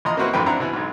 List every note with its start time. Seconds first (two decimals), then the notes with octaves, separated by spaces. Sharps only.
0.05 A#1 E2 D#5 A#5 C6
0.17 A#3 C4 E4 F#4 B4 C5
0.33 A1 F2 G#2 B4 G5 B5
0.46 C4 D4 E4 F#5 A#5
0.60 B2 E3
0.73 B1 G#2